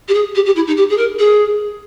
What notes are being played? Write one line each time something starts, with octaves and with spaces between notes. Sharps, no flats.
G4
G#4
G4
G4
E4
D#4
G4
G#4
A#4
G#4